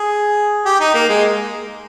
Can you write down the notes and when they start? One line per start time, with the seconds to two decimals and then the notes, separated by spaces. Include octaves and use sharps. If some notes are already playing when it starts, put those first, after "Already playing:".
Already playing: G#4
0.66 G4
0.80 D#4
0.95 A#3
1.09 G#3